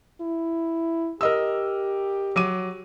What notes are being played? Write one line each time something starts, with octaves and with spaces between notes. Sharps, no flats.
E4
G4 A#4 D#5 E6
F#3 D6 D#7